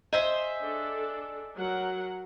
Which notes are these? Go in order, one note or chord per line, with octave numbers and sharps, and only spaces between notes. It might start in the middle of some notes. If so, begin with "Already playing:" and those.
G#4 C5 D#5 E5
D4 A4
F#3 A#4 F#5